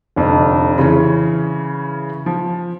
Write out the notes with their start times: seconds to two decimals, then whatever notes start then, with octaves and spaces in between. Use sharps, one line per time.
0.16 F1 F2 D3
0.78 C#3 E3 C#4
2.26 F3